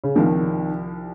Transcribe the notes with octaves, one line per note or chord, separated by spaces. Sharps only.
C#3
C2 C3 D#3 F3